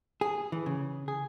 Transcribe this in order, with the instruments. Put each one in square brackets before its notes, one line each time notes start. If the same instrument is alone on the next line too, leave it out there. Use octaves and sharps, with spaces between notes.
[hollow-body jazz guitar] G#4
E3
C#3
G#4